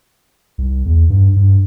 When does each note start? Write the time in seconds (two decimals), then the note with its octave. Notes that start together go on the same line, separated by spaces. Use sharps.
0.58 C2
0.86 E2
1.10 G2
1.36 G2